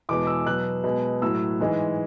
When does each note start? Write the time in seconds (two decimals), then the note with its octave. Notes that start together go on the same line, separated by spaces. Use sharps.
0.09 E2 B2 G#3 D6
0.27 E6
0.46 B2 F#3 F#6
0.84 B2 G#3
1.22 A2 F#3 E6
1.60 G#2 E3 G#3